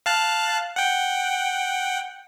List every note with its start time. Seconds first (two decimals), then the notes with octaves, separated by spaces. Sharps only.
0.06 F5 A5 F#6
0.76 F#5 G5